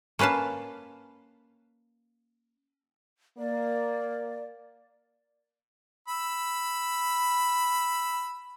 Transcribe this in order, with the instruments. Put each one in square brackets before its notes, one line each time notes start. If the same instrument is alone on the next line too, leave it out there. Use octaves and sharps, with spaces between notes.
[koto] A#3 C#4 B4 F5 A5
[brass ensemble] A#3 [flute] D5
[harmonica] B5 E6